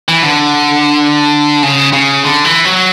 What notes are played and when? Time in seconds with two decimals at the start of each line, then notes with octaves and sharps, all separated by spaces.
0.08 E3
0.23 D3
1.63 C#3
1.93 C#3
2.24 D3
2.44 E3
2.65 F#3